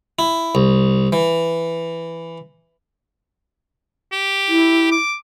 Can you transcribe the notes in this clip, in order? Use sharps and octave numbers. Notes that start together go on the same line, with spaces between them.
E4
C2
E3
G4
E4
D6